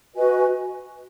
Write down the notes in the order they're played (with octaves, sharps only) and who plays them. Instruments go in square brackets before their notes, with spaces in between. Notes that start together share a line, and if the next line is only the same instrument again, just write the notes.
[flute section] F#4 B4 D#5 G#5